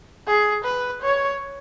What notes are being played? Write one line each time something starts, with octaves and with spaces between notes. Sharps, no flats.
G#4
B4
C#5